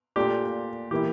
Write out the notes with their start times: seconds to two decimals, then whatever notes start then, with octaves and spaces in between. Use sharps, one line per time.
0.16 A#2 A3 D4 F4 G4
0.91 E3 A#3 E4 G4